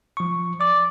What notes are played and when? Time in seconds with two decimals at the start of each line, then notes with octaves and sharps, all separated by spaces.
0.17 F3 C#6
0.61 D5 D6